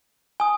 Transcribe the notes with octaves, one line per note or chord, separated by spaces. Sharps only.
G#5 D#6